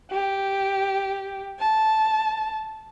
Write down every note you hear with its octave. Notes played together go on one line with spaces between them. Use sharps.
G4
A5